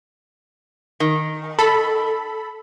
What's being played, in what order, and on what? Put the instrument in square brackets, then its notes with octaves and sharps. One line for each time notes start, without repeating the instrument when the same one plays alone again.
[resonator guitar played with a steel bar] D#3
[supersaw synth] A4 B5